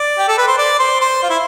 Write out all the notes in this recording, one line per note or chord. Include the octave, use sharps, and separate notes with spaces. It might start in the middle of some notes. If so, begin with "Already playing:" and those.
Already playing: D5
G4
A4
B4
C5
D5
C5
C5
F4
E4